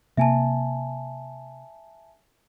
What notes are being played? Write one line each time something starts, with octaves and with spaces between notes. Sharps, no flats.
C3 A#3 E5 G#5 A5